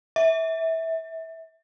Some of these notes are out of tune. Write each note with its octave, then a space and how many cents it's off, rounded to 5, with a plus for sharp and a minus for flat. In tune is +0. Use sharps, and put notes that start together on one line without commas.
E5 -20